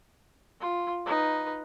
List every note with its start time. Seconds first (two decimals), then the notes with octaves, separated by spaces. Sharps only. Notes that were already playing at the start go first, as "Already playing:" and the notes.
0.60 F4
1.06 D#4 B4